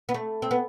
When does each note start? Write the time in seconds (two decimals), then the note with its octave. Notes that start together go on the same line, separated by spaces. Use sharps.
0.09 B3
0.14 A3
0.42 C4
0.51 B3